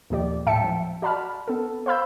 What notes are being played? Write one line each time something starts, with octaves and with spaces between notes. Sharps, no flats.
D#2 A#2 F3 G4 D5
A2 E5 G5 A5 C#7
F3 F#3
F#4 D5 A5 B5 F6
B3 A4
C5 F5 B5 E6 G6